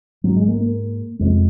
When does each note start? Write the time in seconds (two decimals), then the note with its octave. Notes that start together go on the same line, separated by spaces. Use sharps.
0.24 G#2 F#3
0.36 G#3
0.48 A#3
0.61 A#3
1.19 F2 C3 G#3